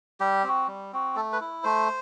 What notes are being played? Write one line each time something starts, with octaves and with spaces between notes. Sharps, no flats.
G3 G4
C4 F#4
G3
C4 F#4
A3 A4
B4
E4
A3 C5